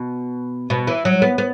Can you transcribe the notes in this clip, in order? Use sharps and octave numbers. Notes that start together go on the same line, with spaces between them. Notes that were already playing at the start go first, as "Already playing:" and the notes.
Already playing: B2
B2
E3
F#3
B3
B3